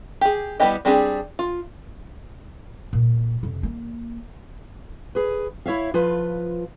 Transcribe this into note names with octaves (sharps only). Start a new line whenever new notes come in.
G4 G#4
G3 B3 E4 G4 D#5
G3 C4 D4 G4 G#4
F4
A#2
F2 C3
A#3
G#4 B4
E4 C#5 E5 F5
F3 F4 B4